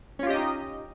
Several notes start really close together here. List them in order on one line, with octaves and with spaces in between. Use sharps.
C#4 F4 G4 D#5 D#4